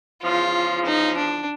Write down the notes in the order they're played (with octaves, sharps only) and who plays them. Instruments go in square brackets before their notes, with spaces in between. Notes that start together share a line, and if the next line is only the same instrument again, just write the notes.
[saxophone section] E2 C#3 F3 [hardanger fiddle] F4
[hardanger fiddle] D#4
D4